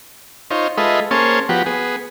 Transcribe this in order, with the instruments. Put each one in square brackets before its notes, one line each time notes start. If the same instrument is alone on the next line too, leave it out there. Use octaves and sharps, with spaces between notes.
[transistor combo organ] D#4 F4 C5 C#5
G#3 F4 A4 B4 D#5 E5
A#3 C#4 G#4 C5 C#5 A5
F3 B3 F#4 G4
B3 G#4